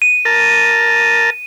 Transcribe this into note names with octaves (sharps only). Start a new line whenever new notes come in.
D#7
A#4 A5